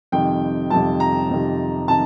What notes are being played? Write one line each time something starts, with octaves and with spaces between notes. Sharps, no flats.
F2 C3 D#3 G3 G5
F2 C3 D#3 G3 A5
A#5
F2 C3 D#3 G3
C3 D#3 A5